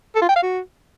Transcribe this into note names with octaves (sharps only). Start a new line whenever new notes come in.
A4
F4
G5
F5
F#4